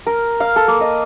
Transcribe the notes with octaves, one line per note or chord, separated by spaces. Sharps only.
A#4
F5
A4
A#3
D#5